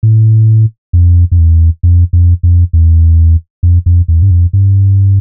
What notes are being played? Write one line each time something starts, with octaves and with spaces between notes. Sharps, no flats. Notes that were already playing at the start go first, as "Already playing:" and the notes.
A2
F2
F2
E2
F2
F2
F2
E2
F2
F2
E2
G2
F2
G2